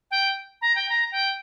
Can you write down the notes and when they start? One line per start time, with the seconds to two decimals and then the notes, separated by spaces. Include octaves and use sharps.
0.11 G5
0.61 A#5
0.76 G5
0.89 A#5
1.12 G5